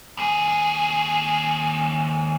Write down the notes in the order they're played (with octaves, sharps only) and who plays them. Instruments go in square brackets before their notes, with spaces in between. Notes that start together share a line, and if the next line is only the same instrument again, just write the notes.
[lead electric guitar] D#2 G#4